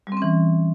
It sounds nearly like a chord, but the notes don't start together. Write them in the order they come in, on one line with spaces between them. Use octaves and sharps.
G3 C4 C#4 E3